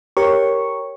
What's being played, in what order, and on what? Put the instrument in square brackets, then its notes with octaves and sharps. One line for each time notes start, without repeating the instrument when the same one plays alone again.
[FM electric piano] G4 A#4 C#5 C#6